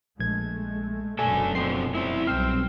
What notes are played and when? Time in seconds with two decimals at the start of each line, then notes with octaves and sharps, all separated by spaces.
0.20 A#1 G#3 A3 G#6
1.19 F1 F#2 B2 A3 D4 A4 G#5
1.55 D3 F3 C4 C7
1.95 C4 E4
2.27 B1 G3 C4 F6